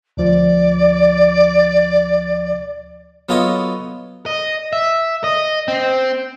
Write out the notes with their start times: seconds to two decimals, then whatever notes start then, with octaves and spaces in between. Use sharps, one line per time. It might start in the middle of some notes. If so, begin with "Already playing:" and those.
0.17 D2 F3 D5
3.29 F#3 B3 F4 A4 C#5 D#5
4.26 D#5
4.73 E5
5.24 D#5
5.68 C4